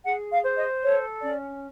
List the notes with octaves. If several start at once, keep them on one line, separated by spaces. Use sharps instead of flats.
G#4 F#5
F5
C5
D#5
A4 C#5
C#4 D5